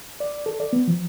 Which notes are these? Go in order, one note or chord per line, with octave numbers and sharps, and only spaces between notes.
D5
A4
D5
B3
F3